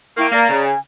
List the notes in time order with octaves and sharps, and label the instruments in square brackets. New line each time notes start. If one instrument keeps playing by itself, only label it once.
[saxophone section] A#3 [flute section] E4 G5 C#6
[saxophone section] A#3 [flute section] D5 A#5
[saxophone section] C#3
[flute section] G#5